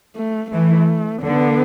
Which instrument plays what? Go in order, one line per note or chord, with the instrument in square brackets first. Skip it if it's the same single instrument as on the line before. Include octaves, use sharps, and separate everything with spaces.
[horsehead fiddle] A3
[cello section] E3 [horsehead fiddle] A3
[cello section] D3 [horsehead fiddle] B3